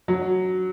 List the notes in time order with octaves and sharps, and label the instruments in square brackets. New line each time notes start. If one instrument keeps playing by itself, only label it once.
[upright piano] F#3